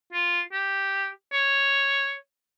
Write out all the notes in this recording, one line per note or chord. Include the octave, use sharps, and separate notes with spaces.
F4
G4
C#5